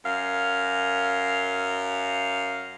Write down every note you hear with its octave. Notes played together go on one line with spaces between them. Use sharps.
F#2 F5